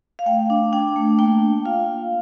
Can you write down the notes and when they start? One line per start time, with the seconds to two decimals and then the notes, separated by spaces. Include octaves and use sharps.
0.19 F5
0.26 A3 G5
0.50 D4
0.73 D4 G5
0.96 A3
1.19 A#3 G5
1.42 D4
1.65 F4 F5
1.89 A#3